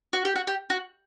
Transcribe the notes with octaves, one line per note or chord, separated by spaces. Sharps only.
F#4
G4
F#4
G4
F#4